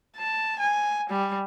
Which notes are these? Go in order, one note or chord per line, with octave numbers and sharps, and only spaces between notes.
A5
G#5
G3